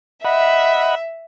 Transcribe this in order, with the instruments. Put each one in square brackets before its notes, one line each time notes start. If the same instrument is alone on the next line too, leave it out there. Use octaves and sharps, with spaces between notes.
[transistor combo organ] D#5 F#5 B5 [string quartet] E5